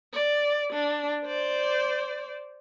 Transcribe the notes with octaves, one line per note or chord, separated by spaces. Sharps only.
D5
D4
C5 D5